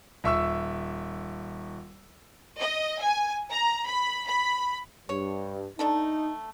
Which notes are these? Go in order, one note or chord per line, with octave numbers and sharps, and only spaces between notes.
D#1 E5 C#6 E6
D#5
G#5
A#5
B5
B5
G2 C#5
A3 D4 D#4 A4